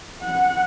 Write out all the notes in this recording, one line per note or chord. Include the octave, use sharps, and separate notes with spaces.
F#5